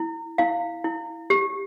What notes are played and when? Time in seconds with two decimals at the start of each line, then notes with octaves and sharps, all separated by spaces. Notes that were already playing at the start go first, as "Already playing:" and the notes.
Already playing: E4
0.38 E4 F5
0.84 E4
1.30 G4